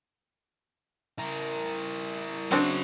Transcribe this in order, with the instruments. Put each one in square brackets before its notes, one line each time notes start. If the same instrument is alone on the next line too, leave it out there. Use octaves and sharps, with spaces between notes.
[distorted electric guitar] E4 A#4
[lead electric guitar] C#3 F#3 [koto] C4 D4